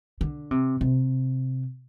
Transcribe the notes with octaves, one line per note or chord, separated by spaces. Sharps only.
D3
C3
C3